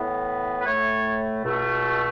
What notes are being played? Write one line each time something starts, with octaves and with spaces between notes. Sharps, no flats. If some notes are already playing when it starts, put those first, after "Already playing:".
Already playing: A2 E3 B3
B4
A2 A3 C#5
C#2 B2 A3